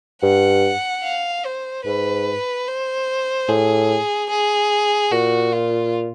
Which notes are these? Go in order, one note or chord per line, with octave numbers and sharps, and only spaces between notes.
G2 F#5
F5
C5
G#2 B4
C5
A2 G#4
G#4
A#2 F#4
F4